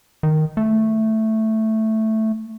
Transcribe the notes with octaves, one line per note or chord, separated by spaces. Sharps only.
D#3
A3